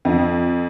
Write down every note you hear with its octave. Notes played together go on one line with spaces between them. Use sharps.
F2